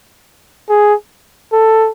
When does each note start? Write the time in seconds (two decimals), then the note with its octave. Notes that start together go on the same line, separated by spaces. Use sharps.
0.69 G#4
1.52 A4